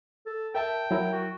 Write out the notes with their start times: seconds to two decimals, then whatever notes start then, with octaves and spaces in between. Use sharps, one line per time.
0.26 A4
0.55 A#4 E5 G5 A5
0.91 F#3 E4 A#4
1.13 F#4